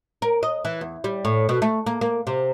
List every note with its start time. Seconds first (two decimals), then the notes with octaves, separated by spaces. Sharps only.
0.22 A#4
0.43 D#5
0.65 E3
0.81 E2
1.04 G3
1.25 A2
1.49 B2
1.62 A3
1.86 A#3
2.01 A#3
2.27 C3